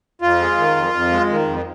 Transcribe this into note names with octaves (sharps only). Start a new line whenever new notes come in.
F2 F4
G#3
D#3
F2
F2
G#3
D#3
F2